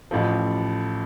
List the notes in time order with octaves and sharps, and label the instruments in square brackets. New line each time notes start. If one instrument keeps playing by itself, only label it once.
[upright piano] A1 A2 F3